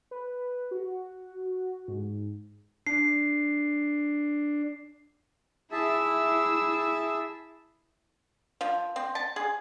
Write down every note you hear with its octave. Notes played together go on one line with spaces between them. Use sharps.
B4
F#4
G#2
D4 C7
E4 G#4 E5 A5 E6
F3
C4
A5
G#4